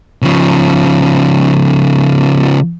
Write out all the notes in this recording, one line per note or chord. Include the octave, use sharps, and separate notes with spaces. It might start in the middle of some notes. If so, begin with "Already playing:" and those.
C#3 F3